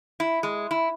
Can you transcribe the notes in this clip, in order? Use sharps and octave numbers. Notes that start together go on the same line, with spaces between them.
E4
G#3
E4